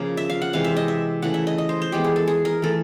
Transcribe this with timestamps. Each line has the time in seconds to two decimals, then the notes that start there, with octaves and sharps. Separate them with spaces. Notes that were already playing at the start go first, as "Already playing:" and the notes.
Already playing: C#3 F3 A#3
0.17 E5
0.30 F5
0.42 F#5
0.53 C3 E3 G#3 F5
0.64 E5
0.77 D#5
0.88 E5
1.22 C#3 E3 A3 F#5
1.34 E5
1.47 D#5
1.58 D#5
1.69 C5
1.82 C5
1.92 E3 G#3 B3 G4
2.04 G#4
2.16 A4
2.27 G#4
2.45 A#4
2.62 E3 A3 A4